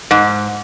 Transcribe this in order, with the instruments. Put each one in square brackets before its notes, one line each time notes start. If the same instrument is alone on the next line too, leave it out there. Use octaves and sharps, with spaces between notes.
[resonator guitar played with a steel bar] G#2